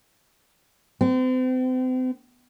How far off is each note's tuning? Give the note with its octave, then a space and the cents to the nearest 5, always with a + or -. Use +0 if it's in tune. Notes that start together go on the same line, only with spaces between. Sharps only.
C4 -40